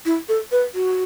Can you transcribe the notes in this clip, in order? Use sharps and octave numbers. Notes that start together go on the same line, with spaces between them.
E4
A4
B4
F#4